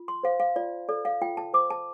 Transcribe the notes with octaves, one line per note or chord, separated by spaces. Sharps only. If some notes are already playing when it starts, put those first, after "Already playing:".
Already playing: F4
C6
C5 F5
F5
F4 D5
A4 D5
F5
F4 G5
A5
C5 D6
A5